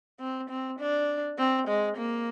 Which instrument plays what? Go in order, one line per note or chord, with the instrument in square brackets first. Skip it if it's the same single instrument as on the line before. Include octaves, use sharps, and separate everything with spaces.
[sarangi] C4
C4
D4
C4
G#3
A#3